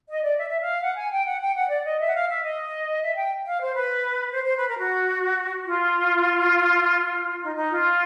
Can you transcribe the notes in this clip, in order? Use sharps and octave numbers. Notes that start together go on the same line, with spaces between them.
D#5
D5
E5
E5
F5
F#5
G#5
G5
F#5
G5
F#5
D5
D#5
E5
F#5
F5
E5
D#5
E5
G5
F5
C5
B4
C5
C5
B4
A#4
F#4
F4
D#4
D#4
F4